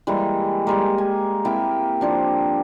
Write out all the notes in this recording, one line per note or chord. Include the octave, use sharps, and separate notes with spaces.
E3 G3 G#3 A#3
G3 G#3 A#3
G#5
A#3 C4 E4 G4
F3 D4 C5